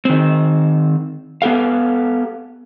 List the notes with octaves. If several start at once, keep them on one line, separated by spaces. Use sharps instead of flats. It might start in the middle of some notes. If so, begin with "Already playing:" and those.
D#3 C4
B3 G4 A4 F5